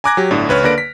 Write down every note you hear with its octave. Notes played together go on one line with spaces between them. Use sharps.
G#5 A#5 D6 F#6 G#6 A#6
F#3 G4
G1 A2 D4
C#2 B4 C#5 F6
D3 A#3 B4 D5 A#6 D7
B6